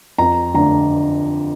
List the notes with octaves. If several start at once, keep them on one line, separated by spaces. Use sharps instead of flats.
F2 A#5
D3 A3 D4 A#5